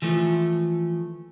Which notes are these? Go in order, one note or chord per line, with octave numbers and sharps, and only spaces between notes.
E3 F3 A3